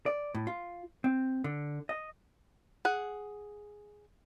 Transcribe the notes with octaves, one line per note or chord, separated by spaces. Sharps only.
D5
A2
F4
C4
D3
D#5
G#4 F#5